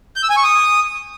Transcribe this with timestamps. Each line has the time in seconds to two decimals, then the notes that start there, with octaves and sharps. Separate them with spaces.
0.16 G6
0.23 E6
0.30 G#5
0.37 C#6
0.44 D#6